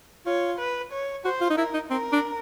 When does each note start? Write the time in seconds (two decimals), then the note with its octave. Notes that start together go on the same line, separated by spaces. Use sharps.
0.26 F4 C#5
0.58 B4
0.92 C#5
1.25 F#4 C5
1.41 F4
1.50 D#4
1.57 E4 A#4
1.74 D#4
1.90 C4 A#4
2.12 D4